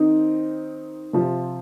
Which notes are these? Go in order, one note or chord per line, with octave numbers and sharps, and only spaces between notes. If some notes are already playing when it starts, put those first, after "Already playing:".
Already playing: D#3 C4 D#4
C3 F3 C4 F4